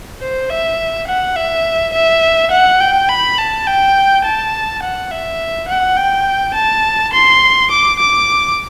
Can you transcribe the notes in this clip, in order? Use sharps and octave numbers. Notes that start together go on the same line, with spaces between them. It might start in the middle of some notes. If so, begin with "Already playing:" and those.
C5
E5
F#5
E5
E5
F#5
G5
B5
A5
G5
A5
F#5
E5
F#5
G5
A5
C6
D6
D6